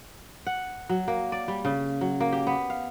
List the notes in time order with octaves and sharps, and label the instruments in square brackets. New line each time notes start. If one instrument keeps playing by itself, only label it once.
[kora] F#5
F#3
A#3
D5
G3
C#3
F#3
A#3
G4
B3
F5